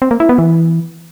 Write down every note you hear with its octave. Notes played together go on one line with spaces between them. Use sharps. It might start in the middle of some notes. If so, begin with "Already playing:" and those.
C4
A#3
E4
B3
E3